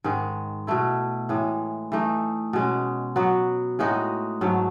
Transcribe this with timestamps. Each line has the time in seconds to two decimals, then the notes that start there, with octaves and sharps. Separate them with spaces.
0.04 G#2 D#3 G#3
0.67 B2 A3 E4
1.29 A2 E3 G#3
1.92 E3 A3 D#4
2.53 B2 G#3 C#4
3.16 F#3 B3 F#4
3.79 A2 G#3 D#4 F#4
4.41 G#2 F#3 A3